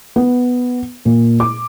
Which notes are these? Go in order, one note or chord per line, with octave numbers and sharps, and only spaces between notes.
B3
A#2
D6